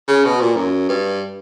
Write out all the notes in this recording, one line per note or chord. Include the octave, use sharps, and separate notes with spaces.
C#3
B2
A#2
F#2
G2